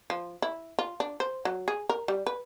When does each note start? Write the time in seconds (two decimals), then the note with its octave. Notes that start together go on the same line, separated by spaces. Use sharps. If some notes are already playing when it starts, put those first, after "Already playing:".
0.10 F3
0.42 E4
0.79 F4
1.00 D4
1.20 C5
1.45 F#3
1.68 G#4
1.89 A#4
2.08 G3
2.26 B4